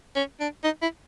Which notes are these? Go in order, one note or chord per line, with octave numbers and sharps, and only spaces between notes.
C#4
D4
D#4
E4